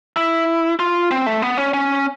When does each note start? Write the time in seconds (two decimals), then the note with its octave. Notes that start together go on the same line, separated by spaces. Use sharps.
0.17 E4
0.79 F4
1.11 C4
1.26 A3
1.42 B3
1.58 C#4
1.74 C#4